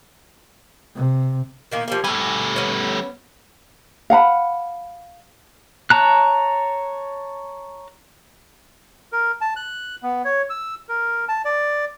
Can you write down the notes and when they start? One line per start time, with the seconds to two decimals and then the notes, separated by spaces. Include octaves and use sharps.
0.95 C3
1.72 A#2 D#3 A#3
1.88 F3 G3 A#3
2.04 G3 A3 G#5
2.56 B3 C#4
4.10 F5 F#5 A#5 B5
5.90 C#5 A5 A#5 F#6
9.13 A#4
9.41 A5
9.56 F#6
10.03 B3
10.25 C#5
10.50 E6
10.89 A#4
11.29 A5
11.45 D5